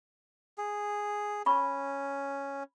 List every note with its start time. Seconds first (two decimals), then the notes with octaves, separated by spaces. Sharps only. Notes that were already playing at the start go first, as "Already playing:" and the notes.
0.58 G#4
1.46 C#4 B5 C#6